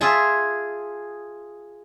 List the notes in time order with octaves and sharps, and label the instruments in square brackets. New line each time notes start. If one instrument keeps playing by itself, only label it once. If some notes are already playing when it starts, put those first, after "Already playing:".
[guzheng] F4 G#4 E5 A5